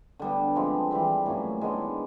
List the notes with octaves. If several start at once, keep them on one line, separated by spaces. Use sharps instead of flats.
D3 G3 B3
F3 G#3 C4
E3 G3 C4
A2 F#3 A#3 C#4
D#3 G#3 B3 D4